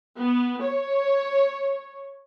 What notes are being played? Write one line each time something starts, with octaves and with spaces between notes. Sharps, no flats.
B3
C#5